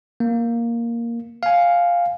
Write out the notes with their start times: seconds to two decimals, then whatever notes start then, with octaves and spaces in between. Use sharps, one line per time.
0.20 A#3
1.43 F5 G#5